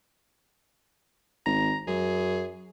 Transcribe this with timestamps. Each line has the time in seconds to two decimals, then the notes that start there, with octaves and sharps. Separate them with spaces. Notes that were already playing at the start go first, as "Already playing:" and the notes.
1.46 G#1 A#5
1.87 F#2 G#4